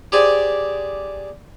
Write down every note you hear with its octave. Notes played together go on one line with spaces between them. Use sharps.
G4 G#4 C5 D5 G#5